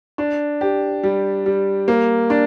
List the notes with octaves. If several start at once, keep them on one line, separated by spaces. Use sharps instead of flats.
D4
G4
G3
G3
A#3
D4